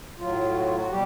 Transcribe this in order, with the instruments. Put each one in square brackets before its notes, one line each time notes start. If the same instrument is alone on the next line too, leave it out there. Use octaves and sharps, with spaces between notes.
[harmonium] A2 F#3 F4
F#4
F4
F#4
B2 G3 G4